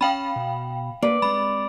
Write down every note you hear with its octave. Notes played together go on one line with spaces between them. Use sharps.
C#4 F5 G5 B5
B2
A#3 B4 D5
G#3 C4 B5